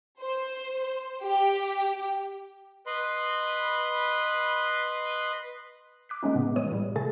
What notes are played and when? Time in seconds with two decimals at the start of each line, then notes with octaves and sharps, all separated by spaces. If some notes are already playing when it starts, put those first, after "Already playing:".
0.20 C5
1.22 G4
2.86 B4 D#5 B5 C6
6.09 D6 F#6 B6
6.23 G#3 A#3 C#4 D#4
6.35 A2 C#3 B3
6.56 E3 G#3 C#5 D#6 D#7
6.72 A2 G3
6.96 C3 A3 G#4 A4 G#5 A6